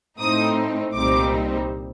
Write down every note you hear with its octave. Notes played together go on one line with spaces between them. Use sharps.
A2 A3 C4 D#4 D#6
C2 A#2 G3 C4 D#4 D6